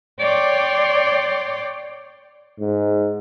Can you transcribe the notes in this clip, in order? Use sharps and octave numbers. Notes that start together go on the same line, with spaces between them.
C#5 D5 G5 C6 D6
G#2